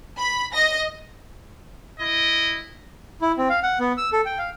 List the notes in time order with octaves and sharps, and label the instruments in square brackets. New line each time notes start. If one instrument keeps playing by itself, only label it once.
[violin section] B5
D#5 A#6
[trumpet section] E4 D#5
[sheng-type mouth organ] E4
C4
F5
F#5
B3
E6
A4
G5
F5